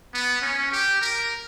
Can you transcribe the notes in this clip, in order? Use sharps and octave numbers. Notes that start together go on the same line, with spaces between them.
B3
C#4
G4
A#4